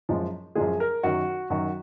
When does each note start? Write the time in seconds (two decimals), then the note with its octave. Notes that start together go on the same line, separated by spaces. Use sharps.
0.09 F#2 F3 G#3
0.55 F#2 F3 G#3 G#4
0.80 A#4
1.03 F#2 D#3 F#3 F#4
1.50 F#2 D#3 F#3 F#4